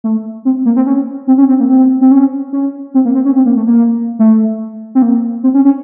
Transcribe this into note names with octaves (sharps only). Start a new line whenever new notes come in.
A3
C4
A#3
C4
C#4
C4
C#4
C4
A#3
C4
C4
C#4
C#4
C4
A#3
C4
C#4
C4
A#3
A3
A#3
A3
C4
A#3
C4
C#4
C#4